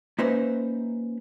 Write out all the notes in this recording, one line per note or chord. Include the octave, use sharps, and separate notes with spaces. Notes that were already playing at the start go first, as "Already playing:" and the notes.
A#3 C#4 D#4 B4 C5 E5